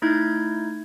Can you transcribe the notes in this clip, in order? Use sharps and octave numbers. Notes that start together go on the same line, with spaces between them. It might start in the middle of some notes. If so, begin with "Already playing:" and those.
A3 D#4 E4 G6 G#6